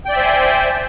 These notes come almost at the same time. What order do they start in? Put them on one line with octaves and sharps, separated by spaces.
G5 D5 E5 C5 G#5